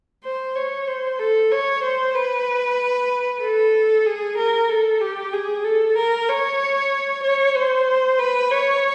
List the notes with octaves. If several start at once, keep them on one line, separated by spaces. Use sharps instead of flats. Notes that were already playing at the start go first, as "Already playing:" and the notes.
C5
C#5
C5
A4
C#5
C5
B4
A4
G#4
A#4
A4
G4
G#4
A4
A#4
C#5
C#5
C5
B4
C#5